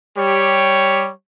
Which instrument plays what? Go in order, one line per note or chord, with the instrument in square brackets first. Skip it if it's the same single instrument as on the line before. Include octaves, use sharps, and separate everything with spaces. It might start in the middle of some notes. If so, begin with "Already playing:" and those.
[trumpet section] G3 G4 C#5